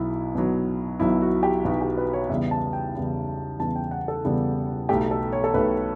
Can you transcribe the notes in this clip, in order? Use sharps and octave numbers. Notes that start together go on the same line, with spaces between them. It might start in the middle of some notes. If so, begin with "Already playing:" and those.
Already playing: B1 B2 F#3 B3 E4
B1 B2 F#3 B3
B1 B2 F#3 B3 E4
F#4
G4
B1 B2 F#3 B3 F#4
G4
B4
C#5
E2 C#3 G3 B3 E5
A5
G5
E2 C#3 G3 B3
E2 C#3 G3 B3 A5
G5
F#5
A4
E2 C#3 G3 B3
B1 B2 A3 G4
A4
C#5
A4
B1 B2 A3 B4